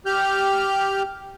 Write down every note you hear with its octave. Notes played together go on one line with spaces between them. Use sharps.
G4 F6 G6